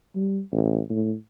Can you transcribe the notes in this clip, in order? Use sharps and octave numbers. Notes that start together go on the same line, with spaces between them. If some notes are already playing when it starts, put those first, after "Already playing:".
G3
A1
A2